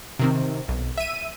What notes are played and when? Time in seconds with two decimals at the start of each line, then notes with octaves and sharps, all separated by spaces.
0.19 C3 D#3 C4
0.69 B1
0.97 E5 D#7